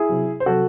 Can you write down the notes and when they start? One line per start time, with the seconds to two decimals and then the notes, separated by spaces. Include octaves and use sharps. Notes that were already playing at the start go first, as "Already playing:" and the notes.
Already playing: E4 G#4
0.09 C3 F#3
0.40 C5
0.46 C3 F#3 F#4 A4